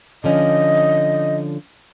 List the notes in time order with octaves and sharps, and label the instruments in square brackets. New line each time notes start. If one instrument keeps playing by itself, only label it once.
[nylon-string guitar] D3 F3 C#4 [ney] D#5